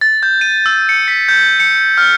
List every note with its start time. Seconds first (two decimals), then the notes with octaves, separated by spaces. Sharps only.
0.01 A6
0.23 G6
0.41 D#7
0.66 E6
0.89 C#7
1.08 B6
1.28 G6
1.60 C#7
1.98 F6